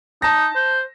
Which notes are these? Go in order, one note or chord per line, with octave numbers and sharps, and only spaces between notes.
D#4 A5 A#6
C5